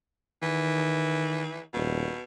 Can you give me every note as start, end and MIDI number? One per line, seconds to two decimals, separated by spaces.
0.43 1.56 51
0.43 1.60 52
1.74 2.09 27
1.74 2.24 47